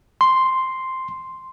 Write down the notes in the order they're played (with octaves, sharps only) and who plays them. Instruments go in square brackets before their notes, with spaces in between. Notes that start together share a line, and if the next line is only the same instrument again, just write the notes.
[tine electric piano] C6